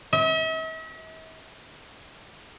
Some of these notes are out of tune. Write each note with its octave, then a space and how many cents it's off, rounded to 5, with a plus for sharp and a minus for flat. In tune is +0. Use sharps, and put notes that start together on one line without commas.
E5 -45